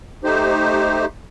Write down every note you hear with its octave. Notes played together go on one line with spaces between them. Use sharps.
A3 D#4 G4 C5